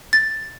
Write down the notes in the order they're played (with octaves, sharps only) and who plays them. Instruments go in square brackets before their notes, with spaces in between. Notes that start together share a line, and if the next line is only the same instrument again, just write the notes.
[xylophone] A6